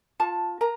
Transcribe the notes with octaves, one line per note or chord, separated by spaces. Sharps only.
F4 A5
A#4 A#5